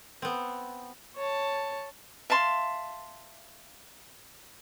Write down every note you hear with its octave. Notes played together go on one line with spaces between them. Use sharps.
B3 C4
C#5 A5
E5 F5 A5 C6